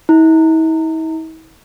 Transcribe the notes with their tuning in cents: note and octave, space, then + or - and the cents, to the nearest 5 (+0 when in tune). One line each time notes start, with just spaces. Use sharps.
E4 -45